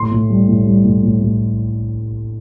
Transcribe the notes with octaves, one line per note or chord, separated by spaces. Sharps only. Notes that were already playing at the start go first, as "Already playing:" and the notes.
Already playing: A2 C6
A2
G3
A2
G3
A2
A2
A2